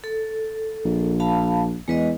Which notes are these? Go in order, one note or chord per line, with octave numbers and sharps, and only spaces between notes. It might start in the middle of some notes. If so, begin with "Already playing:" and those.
A4
A#1
F5 A5 B5
E2 G#3 B4 D#5